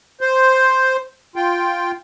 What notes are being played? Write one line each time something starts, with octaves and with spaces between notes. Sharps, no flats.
C5
F4 G5